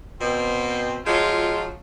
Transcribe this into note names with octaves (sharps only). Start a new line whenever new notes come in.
B2 C4
F3 F#3 G#3 F4